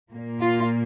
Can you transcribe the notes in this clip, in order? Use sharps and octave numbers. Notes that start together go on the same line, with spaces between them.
A#2 A#3
F4